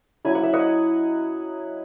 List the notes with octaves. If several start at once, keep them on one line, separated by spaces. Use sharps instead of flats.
F#3 C#4 E4 G#5
F#5
E5
D#5 F#5